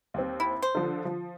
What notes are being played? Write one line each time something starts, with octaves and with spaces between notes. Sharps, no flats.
D#2 C4
E4
C5
D3 F3
F3